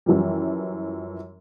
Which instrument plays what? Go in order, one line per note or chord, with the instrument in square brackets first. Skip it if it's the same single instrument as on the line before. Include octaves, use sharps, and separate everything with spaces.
[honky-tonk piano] F#2 E3 F3 G3